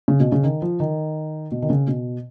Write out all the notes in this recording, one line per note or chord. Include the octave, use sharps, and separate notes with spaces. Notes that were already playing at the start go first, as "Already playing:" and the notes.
C#3
B2
C#3
D#3
F3
D#3
B2
D#3
C#3
B2